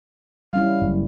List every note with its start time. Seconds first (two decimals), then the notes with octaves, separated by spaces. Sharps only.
0.53 G3 C#4 E4 F5
0.82 F#1